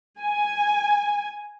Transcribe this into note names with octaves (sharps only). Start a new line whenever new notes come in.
G#5